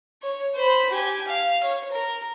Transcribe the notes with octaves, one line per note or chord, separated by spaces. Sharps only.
C#5
C5 B5
G4 G#5
F5
C#5
A#4